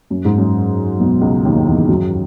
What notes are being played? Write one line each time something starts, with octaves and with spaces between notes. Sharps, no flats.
F#2
G#2
F#2
B1 B2
C#2 C#3
D#2 D#3
E2 E3
F#2 F#3